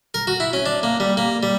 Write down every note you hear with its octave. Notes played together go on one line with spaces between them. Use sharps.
A#4
F#4
E4
C#4
D4
A#3
G3
A#3
G3